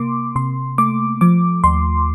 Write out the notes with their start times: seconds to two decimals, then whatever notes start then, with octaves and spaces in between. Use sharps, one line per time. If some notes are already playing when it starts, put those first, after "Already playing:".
Already playing: C3 A#3 C6 D6
0.36 C3 C6
0.78 A3 D6
1.21 F3 D6
1.64 D#2 C6